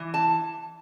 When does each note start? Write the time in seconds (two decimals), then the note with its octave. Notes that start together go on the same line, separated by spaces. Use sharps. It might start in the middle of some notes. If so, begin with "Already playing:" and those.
Already playing: E3
0.14 A5